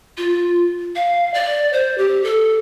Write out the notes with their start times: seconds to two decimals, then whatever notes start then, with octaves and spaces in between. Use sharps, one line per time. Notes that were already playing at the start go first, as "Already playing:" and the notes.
0.18 F4
0.96 F5
1.34 D5
1.73 C5
1.98 G4
2.24 A4